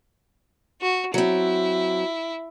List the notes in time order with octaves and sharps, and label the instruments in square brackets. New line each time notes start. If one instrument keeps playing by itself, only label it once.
[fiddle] F#4
[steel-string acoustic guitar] F#3 C4 [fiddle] E4